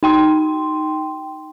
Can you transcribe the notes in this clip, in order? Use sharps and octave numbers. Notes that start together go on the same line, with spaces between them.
D#4 G5 C6